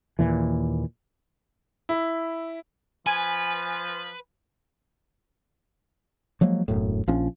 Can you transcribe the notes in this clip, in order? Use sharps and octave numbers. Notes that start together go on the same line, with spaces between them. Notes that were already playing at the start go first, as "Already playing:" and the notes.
D#2 A#2 E3
E4
F3 B4 G#5
F3 F#3 G#3 A#3
E1 F#2 A2
A#1 F3 C#4